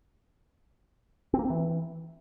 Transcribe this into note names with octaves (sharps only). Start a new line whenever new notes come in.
C4
A#3
C4
E3